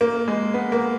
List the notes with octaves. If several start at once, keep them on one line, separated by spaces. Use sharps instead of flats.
A#3
G#3
B3
A#3